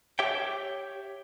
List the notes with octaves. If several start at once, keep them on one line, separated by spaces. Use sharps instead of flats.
G4 C#5 E5 G5